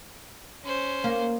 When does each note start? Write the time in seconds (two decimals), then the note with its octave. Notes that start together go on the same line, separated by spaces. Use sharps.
0.64 C#4 C5
1.04 A#3